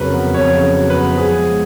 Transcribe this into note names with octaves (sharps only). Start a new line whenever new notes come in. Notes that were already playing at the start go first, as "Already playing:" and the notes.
Already playing: F2 C#3 F#3 A#4 B4
B3
F2 C#5
C#3
F#3
B4
B3
F3 G#4
G#3